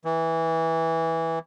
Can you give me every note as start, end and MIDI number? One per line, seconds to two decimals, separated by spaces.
0.05 1.39 52